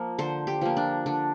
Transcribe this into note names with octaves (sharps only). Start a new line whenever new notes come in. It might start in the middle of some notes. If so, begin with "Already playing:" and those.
Already playing: F3 A#3
D3 C5
G4
F3 A#3
D4
D3 D4